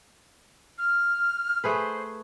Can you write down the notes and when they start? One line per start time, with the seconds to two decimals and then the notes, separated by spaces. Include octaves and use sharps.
0.78 F6
1.64 A3 G#4 B4 C5